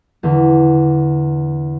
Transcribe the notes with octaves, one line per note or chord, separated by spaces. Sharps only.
E2 D3